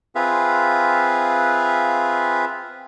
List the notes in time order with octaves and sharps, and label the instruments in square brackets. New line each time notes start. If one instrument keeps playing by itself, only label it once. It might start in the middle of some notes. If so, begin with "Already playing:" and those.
[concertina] C4 F4 G#4 B4 E5 F5